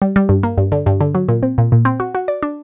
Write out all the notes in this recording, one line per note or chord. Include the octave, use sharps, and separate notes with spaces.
G3
G3
G2
A#3
G2
D3
G2
D3
F#3
A#2
C4
A#2
A#2
C4
F#4
F#4
D5
D4